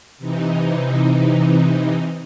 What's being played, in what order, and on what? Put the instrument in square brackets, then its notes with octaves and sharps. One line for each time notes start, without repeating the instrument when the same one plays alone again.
[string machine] C3 E3 D#4